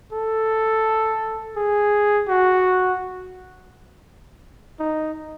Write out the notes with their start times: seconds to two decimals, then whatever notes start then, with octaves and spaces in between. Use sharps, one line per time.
0.12 A4
1.56 G#4
2.28 F#4
4.79 D#4